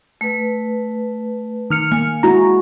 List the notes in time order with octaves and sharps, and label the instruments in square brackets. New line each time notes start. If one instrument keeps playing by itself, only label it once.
[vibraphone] A3 B4
[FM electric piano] D#3 F6 C#7
[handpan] A#3 [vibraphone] G#5
[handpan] G#3 E4 F#4 [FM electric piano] A#5